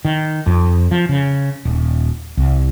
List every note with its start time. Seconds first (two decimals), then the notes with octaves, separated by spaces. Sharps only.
0.05 D#3
0.46 F2
0.91 F3
1.09 C#3
1.65 D#1
2.37 C2